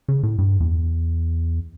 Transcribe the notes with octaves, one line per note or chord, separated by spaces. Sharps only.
C#3
A2
G2
E2